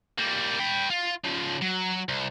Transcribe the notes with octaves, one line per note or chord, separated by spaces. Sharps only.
G3 A#3
B4 G5
F4
C#3 F3
F#3
C2